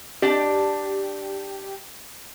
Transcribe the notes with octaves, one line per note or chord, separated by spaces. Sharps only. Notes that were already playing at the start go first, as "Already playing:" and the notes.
D4 G4 D5